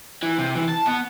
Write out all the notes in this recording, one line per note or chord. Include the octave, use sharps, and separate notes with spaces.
E3
C3
E3
A5
B3